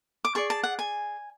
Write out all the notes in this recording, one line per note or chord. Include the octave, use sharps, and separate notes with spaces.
D6
G#4 D5 C#6
A5
F#5
G#5